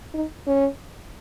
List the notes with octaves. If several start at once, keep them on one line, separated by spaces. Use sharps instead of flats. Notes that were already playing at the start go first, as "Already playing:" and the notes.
D#4
C#4